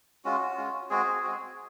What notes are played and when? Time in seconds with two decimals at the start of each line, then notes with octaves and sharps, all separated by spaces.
0.24 G#3 C#4 F4 F#4
0.57 G#3 C#4 F4
0.90 G#3 C4 F#4 G#4
1.23 G#3 C4 F#4